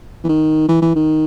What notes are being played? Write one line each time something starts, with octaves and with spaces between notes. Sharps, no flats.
E3
D#3
E3
E3
D#3